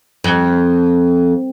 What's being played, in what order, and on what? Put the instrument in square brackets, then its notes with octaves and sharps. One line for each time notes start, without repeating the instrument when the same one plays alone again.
[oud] F2